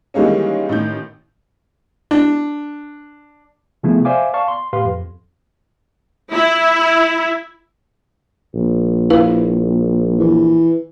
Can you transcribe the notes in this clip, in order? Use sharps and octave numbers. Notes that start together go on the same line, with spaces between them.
D#3 E3 G3 G#3 A#3 C#4
A1 D#3 G6
D4
C3 F3 A3 B3 E4 G#4
C5 D5 E5 F5 G#5 D6
D5 F5 A5 C#6
C6
A2 G4 B4 F5 C6
F2
E4
A#1
E4 B4 F5
E3